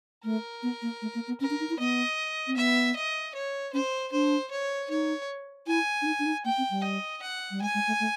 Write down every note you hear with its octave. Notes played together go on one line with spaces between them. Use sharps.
A3 A#4
B3
A#3
A3
A#3
B3
C#4 A#4
D4
D#4
E4
B3 D#5
C4
B3 E5
D#5
C#5
C#4 C5
D4 C5
C#5
D#4 C#5
E4 G#5
D4
D#4
D4
D#4
A#3 G5
C4
G3
D#5
F#5
G3
G#3 G#5
G#3
A3
A3